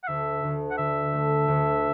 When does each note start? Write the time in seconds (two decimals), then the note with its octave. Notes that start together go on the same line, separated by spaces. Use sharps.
0.04 F#5
0.08 D2 E5
0.43 D2
0.71 F#5
0.78 D3 E5
1.13 A3
1.48 D2